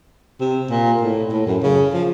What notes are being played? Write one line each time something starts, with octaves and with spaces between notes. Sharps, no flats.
C3
A#2
A2
A2
F#2
C#3
F3